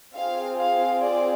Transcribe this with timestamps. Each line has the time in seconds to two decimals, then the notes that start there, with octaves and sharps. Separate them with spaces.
0.14 C4 F4 G#4 F5
0.59 F5
1.04 D5